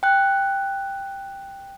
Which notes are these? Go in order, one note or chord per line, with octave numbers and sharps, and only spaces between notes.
G5 F#6